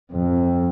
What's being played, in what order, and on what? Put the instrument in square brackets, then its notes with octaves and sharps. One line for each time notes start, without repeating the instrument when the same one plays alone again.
[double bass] F2